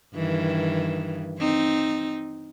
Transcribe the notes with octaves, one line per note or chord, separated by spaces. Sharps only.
G2 D#3 E3
C4 D#4